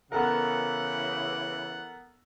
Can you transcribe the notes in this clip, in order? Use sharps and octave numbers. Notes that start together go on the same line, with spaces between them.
C#3 E3 B3 A4 A#4 F#5